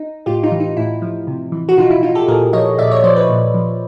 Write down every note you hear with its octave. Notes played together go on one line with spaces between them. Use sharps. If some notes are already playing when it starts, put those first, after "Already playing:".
Already playing: D#4
A2 F4 G4
D#4 F4
E3
D#4
A2 E4
F3
C3
E3
F#4
B2 D#4 F4
E4
D#4 F4
G4 A4
A#2 G#4 A#4
F3 C#5 D#5
A#2 D5 E5
C#5 D#5
F3 C5 D5
B4 C#5
A#2
F3